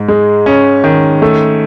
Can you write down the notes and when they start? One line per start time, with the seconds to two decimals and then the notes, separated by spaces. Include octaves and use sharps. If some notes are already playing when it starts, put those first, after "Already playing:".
Already playing: G#2
0.08 G#3
0.46 C#4
0.84 D#3
1.22 A3